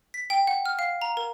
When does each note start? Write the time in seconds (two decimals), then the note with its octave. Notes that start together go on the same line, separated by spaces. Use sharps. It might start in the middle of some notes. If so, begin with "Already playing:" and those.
0.14 B6
0.30 G5
0.47 F#5
0.66 F6
0.79 F5
1.02 A#5
1.17 A#4